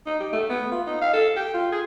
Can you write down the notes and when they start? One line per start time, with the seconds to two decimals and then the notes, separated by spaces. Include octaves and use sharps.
0.06 D#4
0.20 G4
0.33 A3
0.50 B3
0.71 F4
0.87 D#4
1.01 F5
1.13 A4
1.36 G5
1.54 F4
1.72 G#4